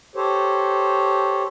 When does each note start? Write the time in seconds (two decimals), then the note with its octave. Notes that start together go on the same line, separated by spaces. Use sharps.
0.16 G4 A4 C5 C#5